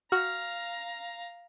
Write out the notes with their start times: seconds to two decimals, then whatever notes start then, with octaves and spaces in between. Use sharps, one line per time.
0.12 F#4 F5 A#5 F6